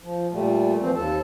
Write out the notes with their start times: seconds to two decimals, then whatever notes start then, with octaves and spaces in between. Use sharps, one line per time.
0.03 F3
0.33 A#2 G3 A3
0.82 E3 F3 C4
0.96 D#2 A4 A5